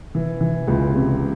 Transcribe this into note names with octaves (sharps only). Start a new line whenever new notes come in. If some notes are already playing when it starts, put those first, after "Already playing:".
E3
E3
C#2
C3